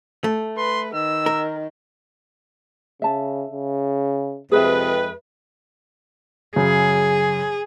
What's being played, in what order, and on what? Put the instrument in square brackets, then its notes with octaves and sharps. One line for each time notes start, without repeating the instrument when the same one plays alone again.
[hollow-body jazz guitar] A3
[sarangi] B4 [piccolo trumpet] C6
[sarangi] D#3 [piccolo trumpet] E6
[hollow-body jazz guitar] A#4
[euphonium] C#3 [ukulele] E5 A5
[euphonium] C#3
[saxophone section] F2 G#3 B4 [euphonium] C3 [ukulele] G#4 E5
[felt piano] F#2 C#3 [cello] G#4